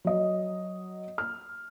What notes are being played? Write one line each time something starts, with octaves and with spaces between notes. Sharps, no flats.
F#3 D#5
F6